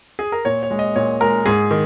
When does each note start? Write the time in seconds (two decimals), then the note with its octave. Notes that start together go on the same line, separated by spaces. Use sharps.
0.19 G#4
0.32 A#4
0.45 A#2 C#5
0.63 C#5
0.70 G#3
0.79 D#5
0.96 A#2 C#5
1.21 G#3 A#4
1.45 G#2 G#4
1.71 D#3